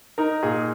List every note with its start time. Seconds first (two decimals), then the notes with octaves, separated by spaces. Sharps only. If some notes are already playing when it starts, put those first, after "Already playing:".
0.18 D#4 A#4
0.43 A#2 G#4